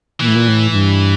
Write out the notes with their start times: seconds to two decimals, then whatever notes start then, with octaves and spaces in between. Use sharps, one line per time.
0.20 A#2 E3
0.28 A2
0.35 A#2
0.48 A2
0.71 A2
0.75 G2